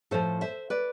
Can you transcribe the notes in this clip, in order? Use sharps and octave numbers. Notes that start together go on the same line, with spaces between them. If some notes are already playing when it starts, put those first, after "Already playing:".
A2 F3 A4 C5
C5 E5
B4 D5